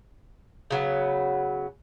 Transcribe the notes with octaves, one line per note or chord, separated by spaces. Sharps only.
C#3 F#3 B3